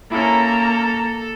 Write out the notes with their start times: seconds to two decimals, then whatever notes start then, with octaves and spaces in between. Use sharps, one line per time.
0.11 A#3 C#4 E4 A4 A#5